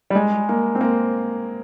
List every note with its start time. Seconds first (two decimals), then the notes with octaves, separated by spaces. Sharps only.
0.10 G3
0.15 G#3
0.49 A#3
0.75 C4
0.81 A#3